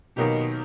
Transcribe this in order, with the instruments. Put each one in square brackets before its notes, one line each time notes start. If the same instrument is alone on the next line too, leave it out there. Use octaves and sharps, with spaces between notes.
[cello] B2 [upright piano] D#3 F#3 A#3 D#4 G4